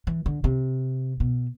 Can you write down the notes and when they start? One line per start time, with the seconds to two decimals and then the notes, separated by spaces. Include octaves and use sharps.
0.07 E3
0.26 D3
0.44 C3
1.20 B2